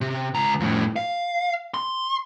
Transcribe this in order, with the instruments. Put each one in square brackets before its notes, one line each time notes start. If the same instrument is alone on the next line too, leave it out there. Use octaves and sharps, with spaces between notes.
[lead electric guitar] C3
C#2 A#5
F2 A2
F5
C6